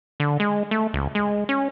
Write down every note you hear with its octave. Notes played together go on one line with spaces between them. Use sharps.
D3
G#3
A3
C#2
G#3
C#4